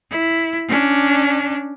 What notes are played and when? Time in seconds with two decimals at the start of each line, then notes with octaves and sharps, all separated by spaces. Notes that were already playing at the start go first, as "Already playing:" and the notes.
0.11 E4
0.68 C#4 D4